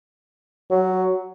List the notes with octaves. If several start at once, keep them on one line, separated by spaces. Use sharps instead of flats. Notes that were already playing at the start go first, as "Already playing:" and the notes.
F#3